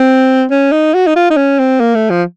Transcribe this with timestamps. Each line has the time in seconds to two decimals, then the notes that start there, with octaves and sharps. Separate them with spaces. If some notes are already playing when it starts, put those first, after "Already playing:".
Already playing: C4
0.50 C#4
0.72 D#4
0.94 F#4
1.07 D#4
1.16 F4
1.30 D#4
1.37 C#4
1.59 C4
1.80 A#3
1.95 A3
2.10 F3